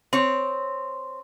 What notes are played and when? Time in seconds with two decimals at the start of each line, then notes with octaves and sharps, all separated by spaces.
0.13 C4 C#5